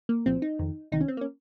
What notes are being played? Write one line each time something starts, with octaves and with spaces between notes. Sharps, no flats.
A#3
C2 A#2 F3 C4
D#4
F2 D#3
C2 C3 D#3 D#4
C#4
C4
A#3
C#4